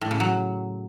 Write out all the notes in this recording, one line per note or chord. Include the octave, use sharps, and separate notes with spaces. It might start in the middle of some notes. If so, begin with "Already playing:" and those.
A2
C#3
F#3